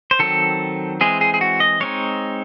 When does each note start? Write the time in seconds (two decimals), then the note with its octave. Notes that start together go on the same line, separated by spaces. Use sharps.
0.11 C5
0.19 D#3 F#3 C4 A4
1.01 E3 G#3 C4 G#4
1.21 G#4
1.34 G#4
1.41 F#4
1.60 D#5
1.80 G#3 C4 D#4 C#5